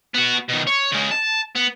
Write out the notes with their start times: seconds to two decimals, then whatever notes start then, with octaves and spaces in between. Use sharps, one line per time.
0.14 B3 F#4
0.49 B2 D#3
0.67 C#5
0.92 C#3 G#3
1.11 A5
1.56 B3